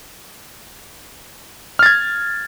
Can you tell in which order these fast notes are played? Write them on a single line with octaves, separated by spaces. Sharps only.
F6 A6 G#6